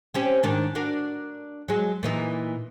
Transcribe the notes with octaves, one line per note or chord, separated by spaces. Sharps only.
C4 C#4 G4
G#2 D#3 D4
D4 F#4 A#4
F#3 G#3
A#2 E3 D#4